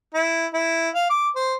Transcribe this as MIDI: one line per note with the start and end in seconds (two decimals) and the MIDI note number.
0.14 0.47 64
0.54 0.89 64
0.95 1.09 77
1.10 1.29 86
1.35 1.55 72